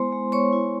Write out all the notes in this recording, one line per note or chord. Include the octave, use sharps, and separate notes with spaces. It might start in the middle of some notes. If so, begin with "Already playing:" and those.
Already playing: G#3 B3 E4 C5 C6
G#3
B3 C#5 C#6
E4